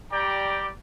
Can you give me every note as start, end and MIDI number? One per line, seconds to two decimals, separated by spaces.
0.11 0.68 55
0.11 0.68 67
0.11 0.68 74
0.11 0.68 79
0.11 0.68 82